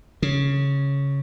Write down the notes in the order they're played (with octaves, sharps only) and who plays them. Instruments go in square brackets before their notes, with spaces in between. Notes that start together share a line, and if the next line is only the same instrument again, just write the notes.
[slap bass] C#3